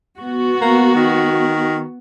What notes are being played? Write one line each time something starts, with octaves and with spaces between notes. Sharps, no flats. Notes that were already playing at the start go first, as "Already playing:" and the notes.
B3 F#4
A#3
D#3